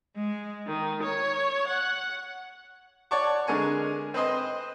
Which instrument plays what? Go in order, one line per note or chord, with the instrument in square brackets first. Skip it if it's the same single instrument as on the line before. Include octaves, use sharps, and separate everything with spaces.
[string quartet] G#3
D#3
C#5
F#5
[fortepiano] C#5 D5 F#5 A5 C#6 D6
D3 G#3 A#4 G#5 C#6
C4 B4 C5 D#5 C6